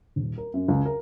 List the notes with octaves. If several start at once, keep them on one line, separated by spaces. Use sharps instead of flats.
D#1
A#4
F#2
C#2
A#4